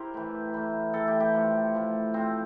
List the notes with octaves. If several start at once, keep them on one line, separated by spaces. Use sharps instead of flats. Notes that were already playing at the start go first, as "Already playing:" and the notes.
Already playing: E4 G4 A#4 C5
A2 E3
A2 E3
A2 E3 A4
G4
G4
A2 F3
A2 F3
A2 F3 C4